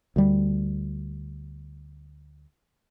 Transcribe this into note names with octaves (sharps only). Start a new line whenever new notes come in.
D2 G3